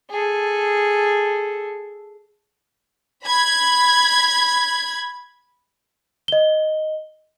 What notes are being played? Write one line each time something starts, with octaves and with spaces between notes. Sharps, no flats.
G#4 A4
B5 G#6
D#5 G7